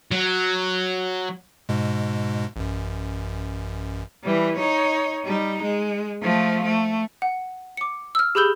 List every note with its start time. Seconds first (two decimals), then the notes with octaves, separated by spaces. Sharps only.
0.11 F#3
1.69 G#2 B2 G#3
2.56 A1 F#2
4.24 E3 G3
4.57 D#4 C#5
5.25 G3 D#4
5.63 G#3
6.22 F3 A3
6.64 A3
7.22 F#5
7.77 D6 C#7
8.15 E6 F6
8.35 G4 G#4 B5 E6 G6 G7